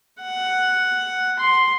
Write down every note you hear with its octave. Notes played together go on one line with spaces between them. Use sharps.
F#5
C6